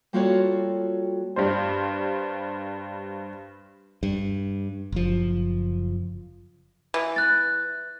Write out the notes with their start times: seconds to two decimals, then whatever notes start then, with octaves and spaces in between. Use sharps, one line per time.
0.13 G3 A#3 F4 F#4 A4 C#5
1.36 G2 G3 C5
4.03 G2
4.92 F#1 F3
6.94 E3
7.16 F#6 A6